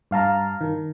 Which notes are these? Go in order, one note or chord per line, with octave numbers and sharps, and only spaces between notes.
G2 F5 A5 A#5
D#3